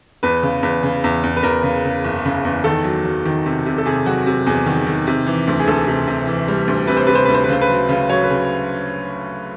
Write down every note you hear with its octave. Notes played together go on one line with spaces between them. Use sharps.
E2 B4
C#3
E2 B4
C#3
E2
E2
B4
E2 A#4
C#3
C#3
F#1
C#3
E2
D#3 A4
F#3
F#3
D#3
C3
C3
A4
C3 G#4
F#3 F#4
C3
E2 G#4
D#3
D#3
C3
E3
D2
G#4
D2 A4
C3
C3
E3
G3
D2
C3 B4
C5
C3 B4
C5
D2 B4
C5
B4
C#3 C5
B4
F#3
C#3
F#3 C#5
B4
C#3